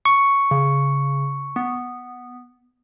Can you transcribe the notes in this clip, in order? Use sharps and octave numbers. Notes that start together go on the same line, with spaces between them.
C#6
C#3
B3